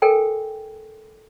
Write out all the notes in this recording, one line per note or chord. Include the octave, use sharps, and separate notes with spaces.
A4 A#4 G5 G#5